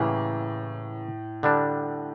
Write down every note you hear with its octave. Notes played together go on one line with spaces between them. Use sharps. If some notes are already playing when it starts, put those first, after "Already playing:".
Already playing: A2 C#3 E3 A#3 G4
D3 G3 D4